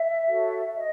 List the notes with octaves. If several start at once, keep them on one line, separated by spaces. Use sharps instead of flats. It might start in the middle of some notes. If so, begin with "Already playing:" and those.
Already playing: E5
F#4 A4 C#5
D#5